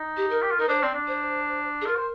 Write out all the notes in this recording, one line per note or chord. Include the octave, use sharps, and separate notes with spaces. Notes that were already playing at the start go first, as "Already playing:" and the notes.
Already playing: D#4
G4
A#4
G4
F4
D#4 A#4
D4 C5
C4 D5
D4
C5
G#4
F4 A#4
C5